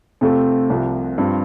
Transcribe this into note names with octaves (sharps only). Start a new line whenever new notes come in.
C3 A3 C4 F4 A4
C2 C3 F3
G2 F3 C4